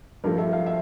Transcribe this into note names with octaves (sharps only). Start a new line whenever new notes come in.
G2 F3 A3 A#4
E5
F5
E5